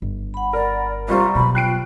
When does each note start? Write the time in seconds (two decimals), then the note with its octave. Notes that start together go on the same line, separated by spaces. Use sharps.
0.02 G1
0.34 F#5 B5
0.53 A#4 D5
1.08 C2 G3 F4 C5 A#5 C#6
1.35 B2 F#3 B5
1.55 F4 G5 F#6 C7 D7